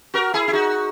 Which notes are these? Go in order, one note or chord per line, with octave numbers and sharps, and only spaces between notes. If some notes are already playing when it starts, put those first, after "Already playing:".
F#4 A#4
E4 G#4
E4
D#4 F#4